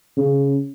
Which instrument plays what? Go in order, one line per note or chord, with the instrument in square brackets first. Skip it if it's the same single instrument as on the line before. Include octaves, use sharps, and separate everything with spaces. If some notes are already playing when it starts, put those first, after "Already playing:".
[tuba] C#3